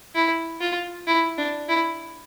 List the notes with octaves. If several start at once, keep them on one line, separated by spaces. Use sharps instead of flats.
E4
F4
E4
D4
E4